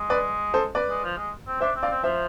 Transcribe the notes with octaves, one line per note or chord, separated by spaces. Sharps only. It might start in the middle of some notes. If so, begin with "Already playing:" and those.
Already playing: G#3
B4 D5
A4 C5
B4 D5
G#3
F3
G#3
C4
D4 C5 E5
C4
D5 F5
C4
F3 C5 E5